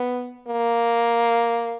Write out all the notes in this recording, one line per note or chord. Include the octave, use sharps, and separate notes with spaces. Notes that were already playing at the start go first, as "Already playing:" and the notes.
Already playing: B3
A#3